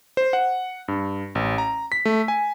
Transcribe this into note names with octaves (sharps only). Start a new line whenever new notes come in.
C5
F#5
G2
A1
A#5
B6
A3
G#5